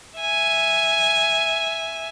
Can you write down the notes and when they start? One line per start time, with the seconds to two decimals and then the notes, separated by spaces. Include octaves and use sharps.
0.19 E5 G#5